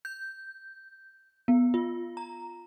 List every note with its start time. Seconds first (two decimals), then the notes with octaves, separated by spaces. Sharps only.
0.05 G6
1.48 B3
1.74 F4
2.17 A#5